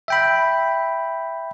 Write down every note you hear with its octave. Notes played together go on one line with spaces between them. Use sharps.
E5 G5 B5